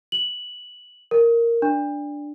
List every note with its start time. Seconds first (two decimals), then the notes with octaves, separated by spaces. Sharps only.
0.12 F#7
1.11 A#4
1.62 D4